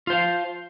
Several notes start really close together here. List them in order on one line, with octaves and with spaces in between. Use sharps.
F4 C5 F5